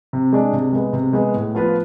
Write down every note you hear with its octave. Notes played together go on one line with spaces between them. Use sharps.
C3
G#3 D4
C3
G#3 B3
C3
G#3 B3
A2
F3 B3 F4 B4